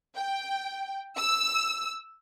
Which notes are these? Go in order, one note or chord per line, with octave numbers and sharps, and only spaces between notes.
G5
E6